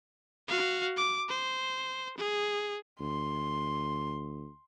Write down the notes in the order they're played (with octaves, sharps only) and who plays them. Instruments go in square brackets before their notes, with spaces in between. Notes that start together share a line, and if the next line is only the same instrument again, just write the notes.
[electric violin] F#4 F5
D6
C5
G#4
[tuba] D2 [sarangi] C6